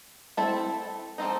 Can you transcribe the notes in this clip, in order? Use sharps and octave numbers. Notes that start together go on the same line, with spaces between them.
A3 C4 E4 A4
F3 A3 C4 D#4